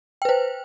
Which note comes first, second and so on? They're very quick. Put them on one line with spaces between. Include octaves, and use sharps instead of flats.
G5 B4 C5